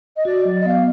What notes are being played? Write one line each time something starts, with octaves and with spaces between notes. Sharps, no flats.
D#5
F#4 D5
F#3
D#5
B3 F5